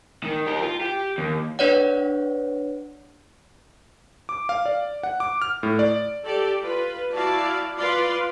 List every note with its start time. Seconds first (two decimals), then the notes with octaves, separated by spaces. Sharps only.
0.24 D#3
0.46 G4 A#4
0.62 F4
0.81 G4
1.18 D#2
1.59 D4 B4 C#5 D5 F#5
4.29 D6
4.49 F5
4.66 D5
5.03 F#5
5.20 D6
5.42 F6
5.63 A2
5.79 D5
6.25 G4 A4 D5
6.62 F4 B4
7.14 E4 F#4 D5 F5 A5
7.77 F4 B4 D5 F5 C6